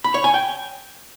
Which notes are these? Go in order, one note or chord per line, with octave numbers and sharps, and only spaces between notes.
B5
C#5
G#5
G5